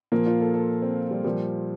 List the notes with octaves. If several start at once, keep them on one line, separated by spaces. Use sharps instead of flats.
A#2 F3 A#3
F4
A4
A4
C4
G3
A#2 F3 G3